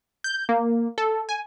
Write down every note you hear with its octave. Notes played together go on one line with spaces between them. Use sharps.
G6
A#3
A4
G#5